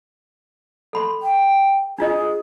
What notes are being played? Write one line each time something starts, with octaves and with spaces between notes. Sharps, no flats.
A4 B5 C6
G5
D4 F4 G#4 D#5